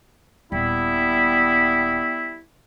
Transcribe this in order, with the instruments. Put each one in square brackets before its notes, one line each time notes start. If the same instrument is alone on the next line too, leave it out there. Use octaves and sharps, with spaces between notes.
[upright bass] D#1 A#2 [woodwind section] G3 B3 E4